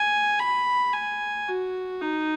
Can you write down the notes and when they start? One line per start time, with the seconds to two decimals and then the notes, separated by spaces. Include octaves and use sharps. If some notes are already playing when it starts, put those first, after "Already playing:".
Already playing: G#5
0.39 B5
0.93 G#5
1.48 F#4
2.01 D#4